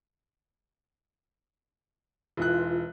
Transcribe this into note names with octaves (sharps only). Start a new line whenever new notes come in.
E1 E3 F4 F#6